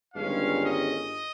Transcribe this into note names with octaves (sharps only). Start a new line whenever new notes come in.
G1 G2 D#3 G#3 C#4 F5
D#5